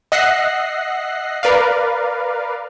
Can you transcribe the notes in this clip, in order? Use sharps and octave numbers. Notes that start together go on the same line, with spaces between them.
D#5 E5 F#5 F#6 A#6 C7
A#4 B4 D5 F5